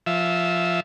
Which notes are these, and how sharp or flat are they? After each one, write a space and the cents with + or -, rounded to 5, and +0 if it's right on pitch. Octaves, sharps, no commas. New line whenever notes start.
F3 +0 E5 -10